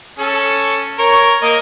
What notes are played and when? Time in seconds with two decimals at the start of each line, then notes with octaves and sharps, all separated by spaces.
0.19 C#4 A4
0.99 A#4 C#5
1.42 A#3 A#4 D#5